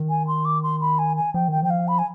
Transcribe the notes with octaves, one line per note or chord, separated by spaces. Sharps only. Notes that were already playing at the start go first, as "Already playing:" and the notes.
Already playing: D#3
G#5
C6
D6
C6
B5
G#5
G#5
F3 G5
D#3 G5
F3 G5
F5
B5
G#5